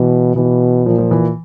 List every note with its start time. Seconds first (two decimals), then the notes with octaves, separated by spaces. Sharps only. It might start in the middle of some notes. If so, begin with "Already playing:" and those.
Already playing: B2 E3
0.36 B2 E3
0.86 A#2 F3
0.98 F3
1.11 E3